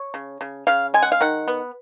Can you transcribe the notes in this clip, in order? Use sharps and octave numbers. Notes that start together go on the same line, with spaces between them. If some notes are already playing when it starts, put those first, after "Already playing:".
Already playing: C#5
C#3
C#3
C#3 F5
G#3 G#5
F#5
F5
D#3 F#5
B3